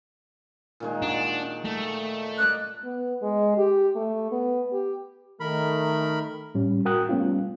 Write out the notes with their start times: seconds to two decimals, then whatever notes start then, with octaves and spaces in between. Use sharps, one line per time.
0.80 A#2 D#3 G#3
1.02 D4 F#4 G#4
1.65 A3
2.38 D5 D#5 F#6
2.84 B3
3.22 G#3
3.58 G4
3.96 A3
4.32 B3
4.73 G4
5.40 D#3 A3 A#4 B5
6.54 A2 G3 C#4
6.85 F#4 A#4 G5 D#6 F#6
7.09 G3 A3 B3 C#4 F4